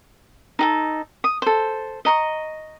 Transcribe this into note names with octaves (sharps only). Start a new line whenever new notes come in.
D#4 G#4 A4
D#6
A4 C5
D#5 A#5 C#6